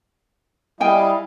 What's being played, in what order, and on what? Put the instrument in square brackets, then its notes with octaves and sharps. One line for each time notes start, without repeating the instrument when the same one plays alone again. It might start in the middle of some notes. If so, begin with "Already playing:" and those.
[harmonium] G3 D#5 F5 [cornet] E4 [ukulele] G5 G#5